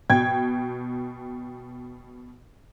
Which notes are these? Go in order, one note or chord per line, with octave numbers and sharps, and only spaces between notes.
B2 G5 G#6